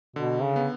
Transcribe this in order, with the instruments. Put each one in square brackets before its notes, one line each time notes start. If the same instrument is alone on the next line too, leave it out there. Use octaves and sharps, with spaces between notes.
[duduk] B2 [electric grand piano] D3
[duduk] C#3
[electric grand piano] B3